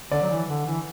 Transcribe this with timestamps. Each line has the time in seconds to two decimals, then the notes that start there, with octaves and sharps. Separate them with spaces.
0.11 D3 D5
0.22 F#3
0.30 E3
0.49 D3
0.66 E3